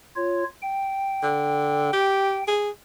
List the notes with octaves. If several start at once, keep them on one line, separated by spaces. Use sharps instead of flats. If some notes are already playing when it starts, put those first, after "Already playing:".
F4 C#5
G5
D3
G4
G#4